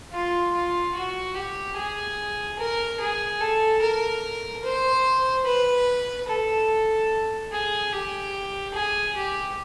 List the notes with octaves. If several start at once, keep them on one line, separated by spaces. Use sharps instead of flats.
F4
F4
F#4
G4
G#4
A#4
G#4
A4
A#4
C5
B4
A4
G#4
G4
G#4
G4